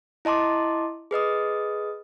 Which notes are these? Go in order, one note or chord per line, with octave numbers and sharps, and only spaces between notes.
E4 D#5 A5 C6 D6
G#4 B4 D#5 D#6